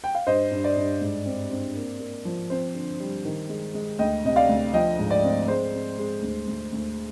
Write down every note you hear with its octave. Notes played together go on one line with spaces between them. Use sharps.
G5
F5
G2 C5 D#5
G2
D5
G2
G#2
C4
C4
A#3
A#3
F3
C4 C5
D3
G3
D#3
G#3
G#3
D2 D#5 G5
C3 D#5
D5 F5
D2
F3 D#5 G5
G#2
D5
C4
G#3 C5
C4
G#3
D2
D2
D2